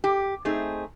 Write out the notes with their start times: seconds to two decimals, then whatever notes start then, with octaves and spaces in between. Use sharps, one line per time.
0.04 G4
0.45 A3 C4 D#4 G#4